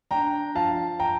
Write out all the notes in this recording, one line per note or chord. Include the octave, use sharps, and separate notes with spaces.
D4 G5 A#5
F3 F5 A5
G5 A#5